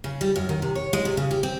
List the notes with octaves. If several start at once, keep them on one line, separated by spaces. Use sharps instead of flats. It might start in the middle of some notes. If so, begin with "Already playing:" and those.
C#3
G3
F#2
D#3
C3
C#5
G#3
C3
C#3
G4
C4